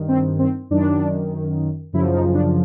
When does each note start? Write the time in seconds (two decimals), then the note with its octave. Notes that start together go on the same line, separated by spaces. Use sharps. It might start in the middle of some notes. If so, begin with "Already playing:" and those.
Already playing: G2 D#3
0.08 C4
0.39 C4
0.70 F#2 D#3 D4
1.93 F#2 C#3 F3 E4
2.14 D#4
2.35 D4